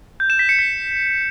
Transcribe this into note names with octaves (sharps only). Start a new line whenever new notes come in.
G6
E7
B6
C#7
B6